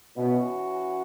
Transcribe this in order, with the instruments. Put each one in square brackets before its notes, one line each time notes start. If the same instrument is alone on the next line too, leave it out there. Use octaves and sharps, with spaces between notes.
[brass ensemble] B2 [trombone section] E3 C#4 F#4